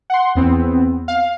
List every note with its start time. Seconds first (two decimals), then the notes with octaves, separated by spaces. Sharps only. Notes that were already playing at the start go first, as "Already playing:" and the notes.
0.10 F#5 C6
0.35 E2 B3 C4
1.08 F5